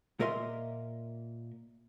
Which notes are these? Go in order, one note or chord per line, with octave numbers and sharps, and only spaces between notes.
A#2 A#3 A#4 D#5 E5 C6